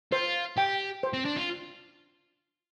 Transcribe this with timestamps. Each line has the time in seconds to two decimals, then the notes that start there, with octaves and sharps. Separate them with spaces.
0.12 F4 C5
0.57 G4 G5
1.03 C5
1.13 C4
1.25 D4
1.36 F4